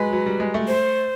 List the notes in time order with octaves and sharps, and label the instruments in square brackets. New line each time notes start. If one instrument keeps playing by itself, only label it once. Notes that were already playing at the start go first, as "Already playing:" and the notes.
Already playing: [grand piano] F#3 G#3 [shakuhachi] B4
[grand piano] F#3
G3
G#3
A3
[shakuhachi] C5